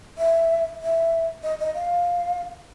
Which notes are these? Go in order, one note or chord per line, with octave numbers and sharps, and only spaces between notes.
E5
E5
D#5
D#5
F5